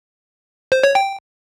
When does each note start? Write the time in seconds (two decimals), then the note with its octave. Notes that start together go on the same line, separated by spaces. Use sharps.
0.72 C5
0.83 C#5
0.95 G5